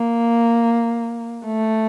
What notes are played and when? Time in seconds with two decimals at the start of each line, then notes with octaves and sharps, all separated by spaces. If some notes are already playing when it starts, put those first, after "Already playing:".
Already playing: A#3
1.46 A3